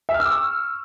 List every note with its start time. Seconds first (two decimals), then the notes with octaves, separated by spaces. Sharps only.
0.09 E5
0.14 F6
0.20 E6
0.25 D6
0.31 C#6